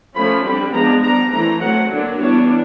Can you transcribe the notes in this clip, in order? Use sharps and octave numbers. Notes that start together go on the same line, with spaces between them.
F3 A3 C#4 B5
D3 G3 C4 B5
F3 G#3 B3 D4 A#5
G3 B3 D4 A#5
E3 A3 C4 A#5
F#3 A3 C4 F#5
D3 F#3 A#3 D4
E3 G3 B3 D4 C#5